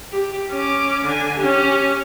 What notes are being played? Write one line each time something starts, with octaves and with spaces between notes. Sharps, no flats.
G4
C#4 D6
D3 G#5
C#4 G4